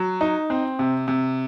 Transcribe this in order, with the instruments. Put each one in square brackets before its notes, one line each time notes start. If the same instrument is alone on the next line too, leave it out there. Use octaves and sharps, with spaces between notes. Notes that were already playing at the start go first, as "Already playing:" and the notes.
Already playing: [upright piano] F#3
D#4
C4
C3
C3